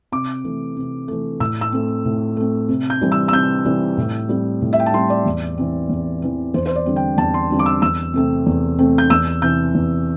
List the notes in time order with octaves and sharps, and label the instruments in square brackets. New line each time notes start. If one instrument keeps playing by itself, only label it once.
[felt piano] C3 D6
E3 A3
C3
E3 A3
A2 E6
E6
A3 C4
A2
A3 C4
C3
G6
E3 G3 C4
E6
E6
C3 G6
E3 G3 C4
A2
G3 C4
A2
E5
G5
A5
G3 C4 C6
D5
E2
E3 C4
E2
E3 C4
E2 C5
C5
D5
D3 G3 C4
G5
E2 A5
C6
D3 G3 C4
D6
E6
E2 E6
C3 A3 C4
E2
C3 A3 C4
G6
E2 E6
C3 E3 G6
E2